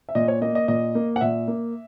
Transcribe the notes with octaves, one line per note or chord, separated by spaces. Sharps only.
E5
A#2 D#5
C#5
A#3 D#5
D#5
A#2 D#5
A#3
F#5
A#2 E5
A#3